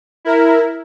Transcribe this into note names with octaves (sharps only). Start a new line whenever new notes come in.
E4 A#4